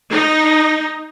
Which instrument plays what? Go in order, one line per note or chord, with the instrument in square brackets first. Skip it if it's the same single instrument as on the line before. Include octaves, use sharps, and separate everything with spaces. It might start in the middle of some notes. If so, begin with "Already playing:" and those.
[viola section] D#4